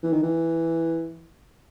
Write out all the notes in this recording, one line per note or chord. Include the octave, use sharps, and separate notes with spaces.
E3
D#3
E3